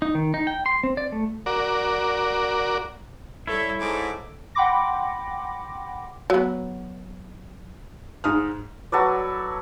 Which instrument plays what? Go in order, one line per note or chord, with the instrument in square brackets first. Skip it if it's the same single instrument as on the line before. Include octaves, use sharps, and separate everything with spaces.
[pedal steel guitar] D#4
D#3
D#4
G5
C6
C4
D5
A3
[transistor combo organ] F#4 A#4 D5
[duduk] G3 [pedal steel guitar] E4 C#5 [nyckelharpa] A4 E5
[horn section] G#2 [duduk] A4 [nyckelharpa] D6
[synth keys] F#5 G5 B5 C6 D6 A#6
[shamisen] F#3 B3
[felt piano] G#2 D#6 F6
[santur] F#3 A4 B4 D5